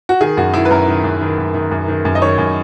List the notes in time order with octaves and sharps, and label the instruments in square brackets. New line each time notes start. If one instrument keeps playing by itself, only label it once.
[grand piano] F#4
D#3 G#4
F#2 F#4
D#3 E4
B4
F#2 A#4
D#3
F#2
D#3
F#2
D#3
F#2
D#3
F#2
D#5
D#3 C#5
F#2